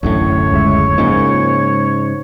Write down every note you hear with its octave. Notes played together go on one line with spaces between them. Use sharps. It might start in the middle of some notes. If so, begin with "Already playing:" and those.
D1 A1 F#2 A2 D3 C#5
C#2 G#3 E5
G#2 C#3 F3 G#3 A#3